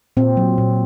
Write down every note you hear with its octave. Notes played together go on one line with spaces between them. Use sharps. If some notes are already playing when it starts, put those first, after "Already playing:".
A#2 C4
F#3
A#2